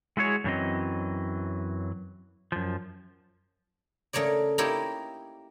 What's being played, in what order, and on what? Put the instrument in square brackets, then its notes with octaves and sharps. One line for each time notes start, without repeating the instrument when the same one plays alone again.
[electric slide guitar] G#3 E4 F#4 G#4 C#5
F#2 C#3 E3 F#3 C4 D#5
F#2 F3
[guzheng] C#3 A3 A#3 C#5 D5
A#3 D#4 E4 G4 C#5